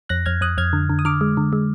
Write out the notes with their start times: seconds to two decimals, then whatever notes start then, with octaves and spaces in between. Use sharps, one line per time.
0.09 F2 F#6 A#6
0.26 F2 F6 G#6
0.41 F2 D#6 F#6
0.58 F2 F6 G#6
0.73 D3
0.90 D3
0.99 D#6
1.05 D3 D6 F6
1.21 G#3
1.37 D3
1.53 G#3